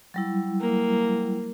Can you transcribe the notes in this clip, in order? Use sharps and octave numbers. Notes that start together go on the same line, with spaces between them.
F#3 G3 E4
A#3